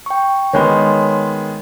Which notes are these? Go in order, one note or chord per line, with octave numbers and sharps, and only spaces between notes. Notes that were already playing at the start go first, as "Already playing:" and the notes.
G5 C#6
D#3 G#3 B3 C#5 G#5 C6